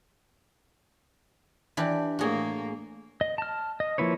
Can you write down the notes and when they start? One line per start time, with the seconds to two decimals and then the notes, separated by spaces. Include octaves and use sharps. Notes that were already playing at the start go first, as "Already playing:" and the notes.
1.77 E3 D4 G4
2.19 A2 A3 A#3 F#4 G#4
3.21 D#5
3.38 A5 F6
3.80 D#5
3.98 F3 A#3 E4 B4 C#5